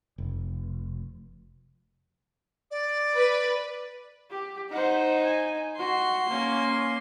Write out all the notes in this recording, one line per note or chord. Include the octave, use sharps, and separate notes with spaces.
F1
D5
B4
G4
D#4 C5 F#5
G#5
F#4 C6
A#3 C#4